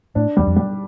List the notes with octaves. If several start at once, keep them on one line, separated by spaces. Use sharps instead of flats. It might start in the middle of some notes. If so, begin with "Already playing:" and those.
A2 D4
E2 G3
F2
G3